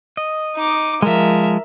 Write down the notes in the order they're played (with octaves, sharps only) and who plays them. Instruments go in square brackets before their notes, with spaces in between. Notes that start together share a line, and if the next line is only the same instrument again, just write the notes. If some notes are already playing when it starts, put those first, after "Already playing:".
[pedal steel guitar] D#5
[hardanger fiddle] D#4 D6
[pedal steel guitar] F3 G#3 [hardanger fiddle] A#4 E5